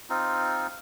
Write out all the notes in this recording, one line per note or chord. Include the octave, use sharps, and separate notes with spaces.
C4 D#4 F4